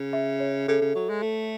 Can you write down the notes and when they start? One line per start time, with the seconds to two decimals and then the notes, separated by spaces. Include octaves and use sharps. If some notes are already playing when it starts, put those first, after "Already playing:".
Already playing: C#3
0.13 E5
0.40 C#5
0.68 C#3 A4
0.81 C#3
0.96 F#3
1.09 G#3
1.22 A3